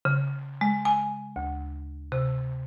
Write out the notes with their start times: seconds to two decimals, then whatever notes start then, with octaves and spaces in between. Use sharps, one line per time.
0.05 C#3
0.61 G#3
0.85 G#5
1.36 D2
2.12 C3